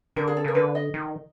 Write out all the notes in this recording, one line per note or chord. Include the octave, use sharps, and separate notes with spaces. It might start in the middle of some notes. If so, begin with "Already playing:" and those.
D3 A#4
G#4
A4
C#3 A#4
D3 B4
D#5
D#3